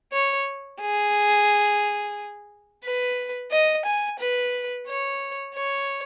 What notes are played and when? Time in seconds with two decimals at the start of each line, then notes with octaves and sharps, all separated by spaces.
0.12 C#5
0.80 G#4
2.84 B4
3.52 D#5
3.85 G#5
4.20 B4
4.87 C#5
5.55 C#5